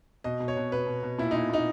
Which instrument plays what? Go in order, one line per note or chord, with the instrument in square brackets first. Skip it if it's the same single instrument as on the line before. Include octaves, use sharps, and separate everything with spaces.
[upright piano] B2 D#5
B2
C#5
B2
B2 B4
B2
B2
A#2 E4
A#2 D#4
A#2 D#4